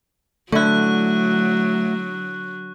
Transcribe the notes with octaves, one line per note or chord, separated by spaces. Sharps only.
D3 F#3 A3 C#4 D4 E4 C#6 F#6